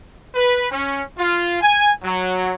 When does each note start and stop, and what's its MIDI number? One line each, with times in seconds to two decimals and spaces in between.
0.35 0.66 71
0.71 1.02 61
1.18 1.57 65
1.62 1.91 80
2.04 2.55 54